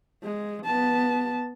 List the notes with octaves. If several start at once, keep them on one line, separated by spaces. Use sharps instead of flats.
G#3
B3 A5